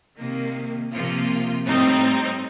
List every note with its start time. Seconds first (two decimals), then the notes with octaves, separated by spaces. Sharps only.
0.17 C3 D#3 A#3
0.92 C3 F3 A#3 F4
1.66 A2 G3 C4 D#4